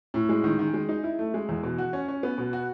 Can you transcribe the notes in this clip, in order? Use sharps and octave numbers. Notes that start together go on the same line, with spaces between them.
A2
G#3
D#3
D#3
G#3
D#4
E4
A3
G#3
E2
B2
F#4
C#4
C#4
B3
B2
F#4